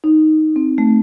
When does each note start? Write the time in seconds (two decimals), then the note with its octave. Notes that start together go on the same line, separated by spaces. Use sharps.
0.04 D#4
0.56 C4
0.78 A3